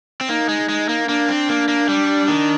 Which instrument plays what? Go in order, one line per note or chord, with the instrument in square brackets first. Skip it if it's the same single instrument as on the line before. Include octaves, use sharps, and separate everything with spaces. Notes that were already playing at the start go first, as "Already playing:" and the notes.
[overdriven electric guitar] C4
[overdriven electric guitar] A#3 [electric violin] D#4
[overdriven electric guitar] G#3
G#3
A#3
[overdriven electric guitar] A#3 [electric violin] D4
[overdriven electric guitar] C4
A#3
A#3
G3
D#3